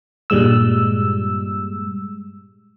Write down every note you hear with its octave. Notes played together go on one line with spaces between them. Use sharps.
G2 A#2 G3 G#3 E6